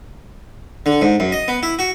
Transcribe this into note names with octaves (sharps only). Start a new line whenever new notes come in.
D3
G#2
F#2
D#5
B3
E4
F#4